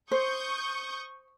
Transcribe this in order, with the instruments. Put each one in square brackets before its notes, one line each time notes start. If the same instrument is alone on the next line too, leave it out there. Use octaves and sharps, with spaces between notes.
[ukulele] C5 [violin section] C#6 D#6 G6